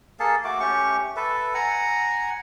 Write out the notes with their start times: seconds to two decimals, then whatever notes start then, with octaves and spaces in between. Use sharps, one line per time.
0.20 A#3 G#4 A4 A5
0.44 A3 F#4 D6
0.60 A3 C#4 G4 C#6
1.16 A4 B4 E5
1.54 F#5 G#5 A#5